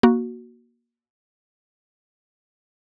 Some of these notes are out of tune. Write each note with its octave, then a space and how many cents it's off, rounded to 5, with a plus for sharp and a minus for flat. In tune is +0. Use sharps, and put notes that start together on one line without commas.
A#3 +25 F#4 +0